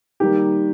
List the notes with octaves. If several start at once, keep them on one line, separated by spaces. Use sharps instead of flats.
D#3 G3 A#3 G4